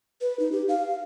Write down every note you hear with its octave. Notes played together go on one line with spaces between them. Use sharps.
B4
D#4
G4
F5